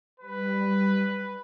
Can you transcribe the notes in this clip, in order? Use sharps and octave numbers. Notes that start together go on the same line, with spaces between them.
G3 B4